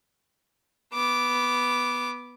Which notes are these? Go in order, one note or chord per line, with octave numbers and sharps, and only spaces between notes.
B3 D6